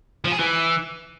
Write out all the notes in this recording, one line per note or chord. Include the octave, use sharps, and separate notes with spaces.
F3
G#4
E3